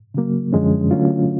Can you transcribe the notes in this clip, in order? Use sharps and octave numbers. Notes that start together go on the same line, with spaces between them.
C#3 F#3 A#3
F#2 D3 F3 G#3 C#4
D3 F#3 A3 C#4 F4